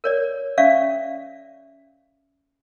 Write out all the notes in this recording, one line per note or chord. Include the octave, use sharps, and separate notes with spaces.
A#4 C#5 D5
C#4 D5 E5 F5 C#6